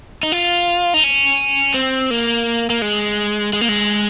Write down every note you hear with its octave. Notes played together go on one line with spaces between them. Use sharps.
D#4
F4
D#4
C#4
C4
A#3
A#3
G#3
G#3
A#3
G#3